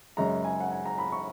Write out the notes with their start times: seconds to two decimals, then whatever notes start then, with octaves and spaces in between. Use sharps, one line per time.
0.17 F#2 C#3 G#3 A#5
0.45 G#5
0.60 F#5
0.71 G#5
0.86 A#5
0.98 B5
1.12 C#6